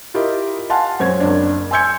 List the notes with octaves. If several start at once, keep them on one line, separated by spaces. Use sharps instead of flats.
E4 F4 G4 A#4 D#5
F5 F#5 G#5 A5 C6
F#2 C4 C#5 G#6
F#1 D4
G#5 C6 E6 G6 G#6 C#7